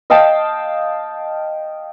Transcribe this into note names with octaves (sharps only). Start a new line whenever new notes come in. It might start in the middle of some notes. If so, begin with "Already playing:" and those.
D#5 F5 G5 A5